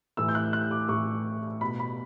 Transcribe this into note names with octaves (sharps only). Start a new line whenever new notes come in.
A2 E3 E6
G6
F#6
F#6
D6
A2 E3 C#6
B2 B5
B5